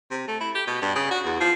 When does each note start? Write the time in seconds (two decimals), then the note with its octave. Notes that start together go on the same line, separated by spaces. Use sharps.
0.11 C3
0.28 A3
0.41 E4
0.55 G4
0.67 B2
0.82 G2
0.95 C#3
1.11 F#4
1.25 E2
1.41 F3